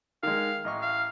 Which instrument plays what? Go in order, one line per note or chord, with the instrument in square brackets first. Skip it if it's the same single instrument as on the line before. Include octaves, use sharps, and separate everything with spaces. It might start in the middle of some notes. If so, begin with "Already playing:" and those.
[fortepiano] D#3 G#3 [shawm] F5
[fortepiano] A1 D#5 C#6
[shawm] F5